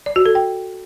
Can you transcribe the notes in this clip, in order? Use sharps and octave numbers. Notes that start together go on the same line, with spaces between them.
D5
F#4
A4
G5